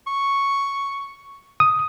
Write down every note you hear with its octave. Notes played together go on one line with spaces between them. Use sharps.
C#6
D#6